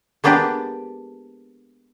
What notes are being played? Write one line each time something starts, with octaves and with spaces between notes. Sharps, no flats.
G#3 A#3 B3 D4 G4 D5